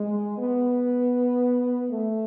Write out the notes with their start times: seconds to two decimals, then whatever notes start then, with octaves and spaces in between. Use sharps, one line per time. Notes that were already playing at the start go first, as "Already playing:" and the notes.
Already playing: G#3
0.37 B3
1.90 A3